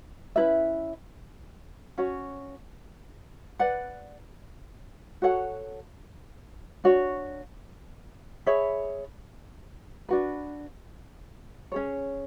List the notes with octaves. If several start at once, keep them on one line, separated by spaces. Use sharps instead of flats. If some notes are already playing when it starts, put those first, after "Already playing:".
C#4 E4 B4 E5
C#4 F#4 C#5
B4 D5 F#5
F#4 A4 C#5 F#5
D4 F#4 C#5
G#4 C#5 E5 B5
D4 F#4 B4
C#4 G#4 C#5